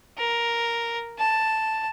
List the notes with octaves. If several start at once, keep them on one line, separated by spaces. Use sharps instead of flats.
A#4
A5